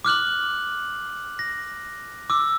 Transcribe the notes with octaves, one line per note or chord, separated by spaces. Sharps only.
D6 F6 F#6 F#7
A#6
D6 E6